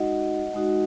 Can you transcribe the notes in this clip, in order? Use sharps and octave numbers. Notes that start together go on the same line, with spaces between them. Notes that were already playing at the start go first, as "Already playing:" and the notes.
Already playing: G#3 D#4 F#4 D#5 F#5
G#3 D#4 F#4